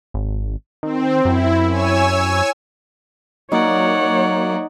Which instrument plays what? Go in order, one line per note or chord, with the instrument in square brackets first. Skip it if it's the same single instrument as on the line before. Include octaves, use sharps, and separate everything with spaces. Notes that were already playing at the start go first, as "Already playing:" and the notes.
[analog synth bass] G#1
[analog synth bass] D#3 [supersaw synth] C4
[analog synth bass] F#2 [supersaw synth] E4
[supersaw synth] C#5 G#5 E6
[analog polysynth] F#3 A#3 [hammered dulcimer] D#4 [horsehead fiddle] C#5 [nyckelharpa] D5 F#5